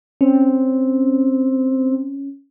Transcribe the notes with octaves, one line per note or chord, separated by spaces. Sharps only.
C4 C#4